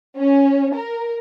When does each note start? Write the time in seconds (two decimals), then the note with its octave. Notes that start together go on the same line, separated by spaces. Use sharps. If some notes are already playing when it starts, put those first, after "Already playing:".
0.17 C#4
0.74 A#4